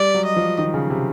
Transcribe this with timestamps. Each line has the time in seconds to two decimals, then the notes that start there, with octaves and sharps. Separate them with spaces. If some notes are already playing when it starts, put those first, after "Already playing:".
Already playing: G3 D5
0.14 F#3
0.25 D#5
0.36 F3
0.58 D#3
0.74 C#3
0.90 C3